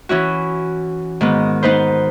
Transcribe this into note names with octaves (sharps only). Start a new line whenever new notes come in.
E3 C#4 E4 F#4
G#2 D#3 B3
B3 D#4 B4 C5